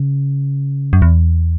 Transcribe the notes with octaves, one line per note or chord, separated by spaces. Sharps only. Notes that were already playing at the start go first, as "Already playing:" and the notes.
Already playing: C#3
F#2
E2